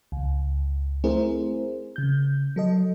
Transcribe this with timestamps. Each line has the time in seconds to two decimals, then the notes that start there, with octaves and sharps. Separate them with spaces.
0.12 C#2
1.04 A3 C4 E4 G#4 A#4 C5
1.96 C#3 G6
2.56 F#3 A4 D#5